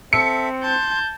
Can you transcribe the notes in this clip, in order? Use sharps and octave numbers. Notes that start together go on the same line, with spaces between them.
C4 A4 E5 C#7
A5 C6 G6